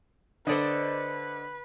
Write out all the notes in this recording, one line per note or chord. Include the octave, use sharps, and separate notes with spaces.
D3 A4 B4 C5 D5 D#5